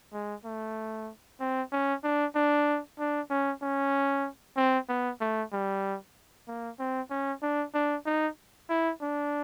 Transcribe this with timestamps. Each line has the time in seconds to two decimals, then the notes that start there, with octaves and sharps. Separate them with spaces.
0.13 G#3
0.45 A3
1.40 C4
1.72 C#4
2.04 D4
2.35 D4
2.99 D4
3.30 C#4
3.62 C#4
4.56 C4
4.89 B3
5.21 A3
5.52 G3
6.48 A#3
6.79 C4
7.10 C#4
7.42 D4
7.74 D4
8.06 D#4
8.69 E4
9.02 D4